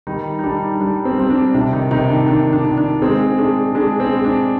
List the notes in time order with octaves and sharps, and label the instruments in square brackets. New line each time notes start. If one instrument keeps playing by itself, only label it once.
[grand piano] D#3 G3 D#4
D#4
G3 D4
G3 D4
C4
G3 C4
D4
C3 D4
D#3 D#4
C3 D#3 D#4
D4
D#3 D4
D4
D#3
D4
G#3 C4
G#3 D4
G#3 D4
C4
G#3
D4